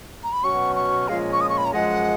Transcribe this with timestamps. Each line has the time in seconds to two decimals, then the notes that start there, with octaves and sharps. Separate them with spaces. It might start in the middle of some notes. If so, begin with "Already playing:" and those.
0.23 A#5
0.33 B5
0.43 B2 F#3 C#4 F#4 C#6
0.76 C#6
1.08 A#2 F3 G#3 C#4 F4 F5
1.33 C#6
1.41 D#6
1.49 C#6
1.58 B5
1.65 A#5
1.73 F#2 F3 G#3 F#5